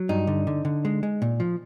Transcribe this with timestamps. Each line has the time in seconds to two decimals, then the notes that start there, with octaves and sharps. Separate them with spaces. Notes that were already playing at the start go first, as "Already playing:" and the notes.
Already playing: F#3
0.09 G2 D#4
0.27 D3
0.47 D3
0.65 D3
0.85 G#3
1.03 G#3
1.22 A#2
1.40 F3